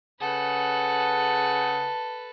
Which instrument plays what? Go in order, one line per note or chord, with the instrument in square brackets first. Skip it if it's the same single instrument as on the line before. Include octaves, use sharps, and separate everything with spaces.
[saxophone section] C#3 G#4 F#5 [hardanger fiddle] A4 B4